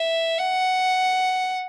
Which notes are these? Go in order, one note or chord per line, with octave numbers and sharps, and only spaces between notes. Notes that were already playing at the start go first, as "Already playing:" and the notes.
Already playing: E5
F#5